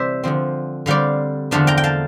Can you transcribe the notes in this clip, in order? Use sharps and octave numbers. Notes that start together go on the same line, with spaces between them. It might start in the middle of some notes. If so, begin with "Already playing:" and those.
Already playing: C3 E3 G3 C5 D5 E5
D3 F3 C4
D3 G3 C4 D5 F5
E2 D3 F3 A3 D4 F5 A5
G5 A#5
G5
F5 A5